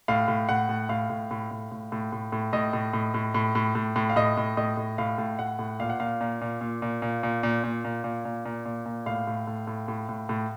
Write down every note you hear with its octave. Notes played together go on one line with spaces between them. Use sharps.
A2 F5
A2
A2 F#5
A2
A2 F5
A2
A2
A2
A2
A2
A2
A2
A2 D#5
A2
A2
A2
A2
A2
A2
A2
F5
A2 D#5
A2
A2 D#5
A2
A2 F5
A2
A2 F#5
A2
A#2 F5
F#5
A#2 F5
A#2
A#2
A#2
A#2
A#2
A#2
A#2
A#2
A#2
A#2
A#2
A#2
A#2
A#2
A2 F5
A2
A2
A2
A2
A2
A2